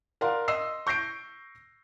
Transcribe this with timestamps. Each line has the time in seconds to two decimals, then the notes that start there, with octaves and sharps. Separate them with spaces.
0.21 A#4 D5 F5 F#5 C6
0.48 D#5 C6 E6 C7
0.87 C#6 G6 A#6 C7 D7